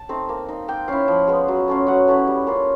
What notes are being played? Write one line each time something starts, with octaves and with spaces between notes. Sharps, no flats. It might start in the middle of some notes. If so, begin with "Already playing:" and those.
Already playing: A5
A3 C4 D#4
A#3
D#4
A#3 G5
C#4 E4 F5
F3
G#3 B3
F#3
A3 C#4 F4
F#3 F#5
A3 C#4 E4
G3
A#3 C#4 F4